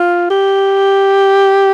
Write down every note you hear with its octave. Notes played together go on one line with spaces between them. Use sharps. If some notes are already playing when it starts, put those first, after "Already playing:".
Already playing: F4
G4